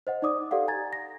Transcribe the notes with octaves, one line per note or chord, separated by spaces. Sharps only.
C5 D#5 F#5
D#4 D5 D6 D#6
G4 A4 D5 F5 F#5
G#5 A#5 G#6 A6
A#6